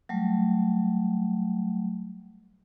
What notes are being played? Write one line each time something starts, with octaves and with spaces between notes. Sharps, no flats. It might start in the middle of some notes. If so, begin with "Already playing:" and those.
F#3 G3 A3